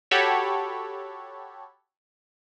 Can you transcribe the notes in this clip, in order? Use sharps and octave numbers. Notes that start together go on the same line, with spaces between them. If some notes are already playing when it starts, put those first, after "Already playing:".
F#4 G4 A4 C#5 B5